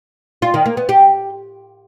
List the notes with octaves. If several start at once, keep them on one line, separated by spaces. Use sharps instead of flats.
F4
D#3
A#3
B3
G4